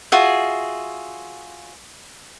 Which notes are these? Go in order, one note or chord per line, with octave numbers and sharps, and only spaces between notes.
F4 F#4 G#4 E5